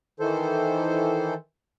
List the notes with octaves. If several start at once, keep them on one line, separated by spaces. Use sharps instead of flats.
D#3 E3 A4 C5